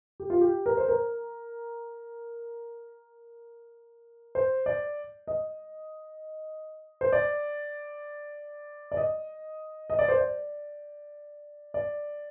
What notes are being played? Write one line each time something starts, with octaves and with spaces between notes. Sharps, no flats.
G4
F4
G4
A#4
C5
A#4
C5
D5
D#5
C5
D5
D5
D#5
D#5
D5
C5
D5
D5